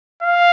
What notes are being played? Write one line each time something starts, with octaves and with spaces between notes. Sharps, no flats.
F5